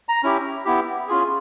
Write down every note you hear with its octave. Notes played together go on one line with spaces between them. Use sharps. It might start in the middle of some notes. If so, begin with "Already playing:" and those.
A#5
C#4 E4 G4
B3 E4 G4
C#4 F4 G#4